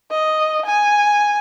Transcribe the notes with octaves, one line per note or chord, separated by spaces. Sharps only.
D#5
G#5